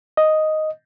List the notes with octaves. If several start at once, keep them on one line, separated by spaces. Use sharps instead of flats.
D#5